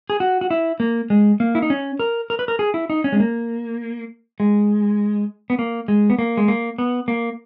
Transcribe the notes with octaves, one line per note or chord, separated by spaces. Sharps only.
G#4
F#4
F#4
E4
A#3
G#3
A#3
E4
D#4
C#4
A#4
A#4
B4
A#4
G#4
E4
D#4
C#4
G#3
A#3
G#3
B3
A#3
G#3
B3
A#3
G#3
A#3
B3
A#3